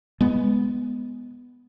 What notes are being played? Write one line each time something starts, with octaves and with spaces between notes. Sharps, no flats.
G#3 B3